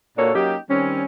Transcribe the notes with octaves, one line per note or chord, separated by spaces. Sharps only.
A#2 A#3 D4 F#4 A4 C#5
F#3 A#3 C#4 D#4 G4
D#3 G3 C4 C#4